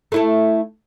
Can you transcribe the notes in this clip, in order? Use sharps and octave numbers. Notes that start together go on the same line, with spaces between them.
A3 E4 A4